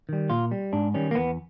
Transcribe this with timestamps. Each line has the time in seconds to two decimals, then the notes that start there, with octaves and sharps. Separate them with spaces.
0.09 D#3 G3
0.30 A#2 F4
0.51 G3
0.73 G#2 D4
0.94 D#3 G3 C#4
1.11 A#3
1.15 E2 B3